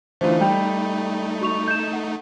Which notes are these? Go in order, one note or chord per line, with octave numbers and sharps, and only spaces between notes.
D3 E3 A3 D#4 F4 C5
G3 G5
F#4 C#6 F7
G6 E7
F#5